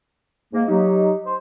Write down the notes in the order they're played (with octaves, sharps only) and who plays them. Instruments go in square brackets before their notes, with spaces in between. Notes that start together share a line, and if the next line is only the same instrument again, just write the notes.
[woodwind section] G#2 A#3
[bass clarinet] F#3 [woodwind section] D#4 G4
[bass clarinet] C5